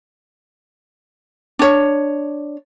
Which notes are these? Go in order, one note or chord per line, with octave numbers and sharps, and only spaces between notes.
D4 C#5